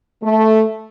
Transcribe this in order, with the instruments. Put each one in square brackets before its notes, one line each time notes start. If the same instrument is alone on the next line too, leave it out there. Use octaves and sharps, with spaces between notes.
[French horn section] A3